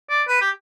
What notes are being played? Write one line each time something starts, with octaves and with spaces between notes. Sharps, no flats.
D5
B4
G4